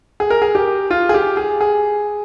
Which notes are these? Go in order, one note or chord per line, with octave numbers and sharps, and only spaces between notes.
G#4
A#4
G#4
G4
F4
G#4
G4
G#4
G#4